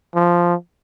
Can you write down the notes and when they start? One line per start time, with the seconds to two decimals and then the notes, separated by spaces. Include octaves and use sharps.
0.15 F3